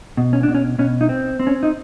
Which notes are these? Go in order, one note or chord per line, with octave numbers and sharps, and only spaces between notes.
B2
C#4
D4
B2
C#4
B2 C#4
D#4
C4
C4
C#4
D#4